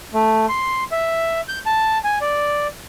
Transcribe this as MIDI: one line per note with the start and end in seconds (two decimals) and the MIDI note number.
0.14 0.46 57
0.49 0.84 84
0.92 1.41 76
1.48 1.59 91
1.66 1.98 81
2.04 2.18 80
2.21 2.67 74